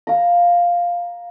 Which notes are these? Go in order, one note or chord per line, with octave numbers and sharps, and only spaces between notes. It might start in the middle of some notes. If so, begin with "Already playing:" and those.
F5 A#5